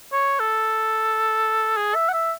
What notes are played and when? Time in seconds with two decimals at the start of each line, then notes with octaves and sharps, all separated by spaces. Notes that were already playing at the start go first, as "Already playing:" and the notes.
0.12 C#5
0.40 A4
1.77 G#4
1.95 E5
2.09 F#5
2.13 E5